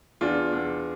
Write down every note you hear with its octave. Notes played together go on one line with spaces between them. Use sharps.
E2 D4 F4
E2